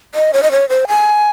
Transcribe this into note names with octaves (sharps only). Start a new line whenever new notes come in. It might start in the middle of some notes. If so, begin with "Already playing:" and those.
D#5
C#5
D#5
C#5
C5
G#5